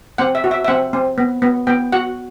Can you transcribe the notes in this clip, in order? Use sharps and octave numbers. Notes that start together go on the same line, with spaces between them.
C4 F#5
E5
F#4
E5
E5
C4 F#5
C4
B3
B3
B3 G5
F#4 F#5